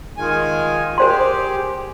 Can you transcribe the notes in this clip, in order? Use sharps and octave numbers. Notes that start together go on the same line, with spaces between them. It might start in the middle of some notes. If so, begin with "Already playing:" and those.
D#3 G#3 F4 G#5
G4 G#4 A#4 C5 C6